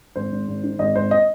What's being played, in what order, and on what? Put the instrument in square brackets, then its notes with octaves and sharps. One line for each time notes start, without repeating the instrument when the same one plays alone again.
[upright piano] G#1 C5
G#1
G#1
D#3
G#1 D#5
G#1 C5
D#5